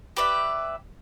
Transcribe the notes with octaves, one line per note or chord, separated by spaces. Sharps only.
G4 B4 D5 E5